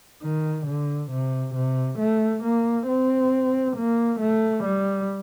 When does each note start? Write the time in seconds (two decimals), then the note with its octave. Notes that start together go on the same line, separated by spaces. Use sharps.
0.23 D#3
0.67 D3
1.11 C3
1.55 C3
1.99 A3
2.44 A#3
2.88 C4
3.76 A#3
4.21 A3
4.64 G3